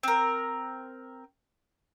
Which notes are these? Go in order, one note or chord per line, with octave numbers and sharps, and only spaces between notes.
C4 A#4